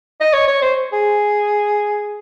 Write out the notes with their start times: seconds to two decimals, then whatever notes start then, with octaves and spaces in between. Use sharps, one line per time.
0.21 D#5
0.33 C#5
0.48 C#5
0.62 C5
0.92 G#4